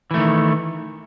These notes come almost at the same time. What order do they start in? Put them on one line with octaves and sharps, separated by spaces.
E3 A3 D#3